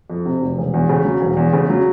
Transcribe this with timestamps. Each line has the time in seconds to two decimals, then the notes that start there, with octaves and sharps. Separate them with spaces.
0.10 F2
0.25 C3
0.41 F1
0.58 E1
0.74 E2
0.89 C#3
1.05 F#3
1.21 E1
1.37 E2
1.53 C#3
1.70 F#3